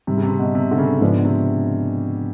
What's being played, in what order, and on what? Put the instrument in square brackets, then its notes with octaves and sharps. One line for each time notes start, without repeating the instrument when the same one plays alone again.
[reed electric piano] G#2 D#3 G3 [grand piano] C3
[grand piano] C#3
C3
B2
C3
D3
C#3
[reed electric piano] G#2 F3 G#3 B3 D4 [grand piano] C#3
[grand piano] C3